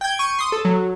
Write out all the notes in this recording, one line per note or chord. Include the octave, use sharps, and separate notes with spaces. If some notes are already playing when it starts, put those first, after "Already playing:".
G5 G6 G#6
C#6 D#7
C6 D#6
A4
F#3